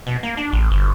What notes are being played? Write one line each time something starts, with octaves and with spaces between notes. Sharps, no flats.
B2
A#3
D4
A1
G1